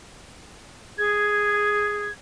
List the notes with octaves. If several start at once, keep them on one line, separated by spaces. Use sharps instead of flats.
G#4 G#6